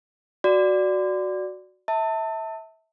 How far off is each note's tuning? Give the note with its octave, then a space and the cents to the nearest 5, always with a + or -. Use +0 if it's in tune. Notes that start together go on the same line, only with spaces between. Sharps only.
F#4 +0 D5 +0
E5 -25 A5 +25